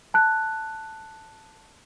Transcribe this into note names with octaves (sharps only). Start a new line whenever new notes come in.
A5 F#6